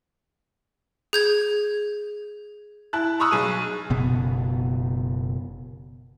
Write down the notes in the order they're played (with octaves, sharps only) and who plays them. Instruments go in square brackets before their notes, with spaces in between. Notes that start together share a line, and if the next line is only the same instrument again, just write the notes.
[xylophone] G#4 G6 G#6
[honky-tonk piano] E4 A5 F#6
A#5 B5 C#6 D#6 E6 F#6
B1 G#4 D#7
[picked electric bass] F#1 B2 B3